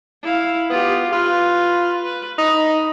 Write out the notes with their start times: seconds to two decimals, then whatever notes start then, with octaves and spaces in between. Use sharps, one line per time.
0.23 E4 F5
0.70 B3 F4 G4
1.12 F4 B4
2.04 B4
2.39 D#4 B5